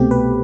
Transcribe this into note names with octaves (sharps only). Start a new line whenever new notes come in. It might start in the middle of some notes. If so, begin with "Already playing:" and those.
Already playing: C2 B2 A3 C4 G4
B4